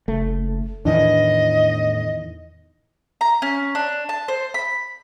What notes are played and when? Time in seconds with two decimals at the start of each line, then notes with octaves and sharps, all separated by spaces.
0.08 F#1 A3
0.85 E2 A2 D#3 E3 D4 D#5
3.21 A#5
3.42 C#4
3.75 D4
4.09 A5
4.28 C5
4.54 B5